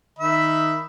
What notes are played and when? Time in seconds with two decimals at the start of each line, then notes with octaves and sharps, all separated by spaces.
0.19 D#3 E5 B5